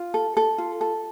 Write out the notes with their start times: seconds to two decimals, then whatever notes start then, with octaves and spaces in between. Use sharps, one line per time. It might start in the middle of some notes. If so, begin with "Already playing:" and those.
Already playing: F4
0.14 A4
0.37 A4
0.58 F4
0.81 A4